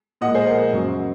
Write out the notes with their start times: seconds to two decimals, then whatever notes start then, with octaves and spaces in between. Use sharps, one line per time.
0.21 A#2 F3 G#3 D#5 F#5
0.35 G#4 C5
0.46 A#4
0.72 F#2 C#3 F#3